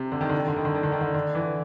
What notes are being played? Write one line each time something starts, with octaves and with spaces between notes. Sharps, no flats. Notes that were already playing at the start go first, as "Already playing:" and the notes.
Already playing: C3
D3
D#3
D3
D#3
D3
D#3
D3
D#3
D3
D#3
D3
D3
E3